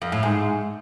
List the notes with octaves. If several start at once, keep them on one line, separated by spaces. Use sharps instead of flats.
F2
A2
G#2